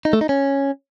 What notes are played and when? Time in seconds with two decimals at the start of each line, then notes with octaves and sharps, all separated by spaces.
0.05 D#4
0.13 A3
0.21 D#4
0.29 C#4